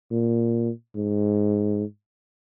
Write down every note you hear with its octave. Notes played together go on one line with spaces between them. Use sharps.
A#2
G#2